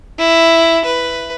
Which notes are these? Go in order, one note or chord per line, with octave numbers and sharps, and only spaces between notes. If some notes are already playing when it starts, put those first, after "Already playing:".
E4
B4